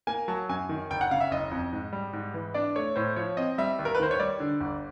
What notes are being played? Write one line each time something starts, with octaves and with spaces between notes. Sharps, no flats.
A#3 G#5
F#3 A5
F#2 G#5
D#3
F#1 G5
F#5
C#3 F5
E5
F#1 D#5
F2
G#2
G3
G#2
E3
D4 D5
A3 C#5
A2 C5
F3 C#5
C4 D#5
G3 E5
D#2
A#4
B4
D#3 C5
C#5
G3 D5
D3
G1